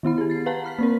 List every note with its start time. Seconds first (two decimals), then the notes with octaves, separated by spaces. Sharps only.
0.03 D#3 B3 E4 B5
0.18 G4 G#4
0.30 A6 C7
0.46 B4 F5 F#5 A5 A#5
0.64 B5 F6 B6
0.79 A#3 C4 A#4